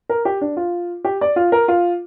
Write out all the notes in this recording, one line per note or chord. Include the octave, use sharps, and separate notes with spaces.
A#4
G4
D4
F4
G4
D5
F4
A#4
F4